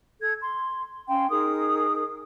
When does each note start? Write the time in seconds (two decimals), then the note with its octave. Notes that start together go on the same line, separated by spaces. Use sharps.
0.21 A4 G#6
0.41 C6
1.08 C#4 F5 G5 C6
1.30 D#4 G#4 A#4 D#6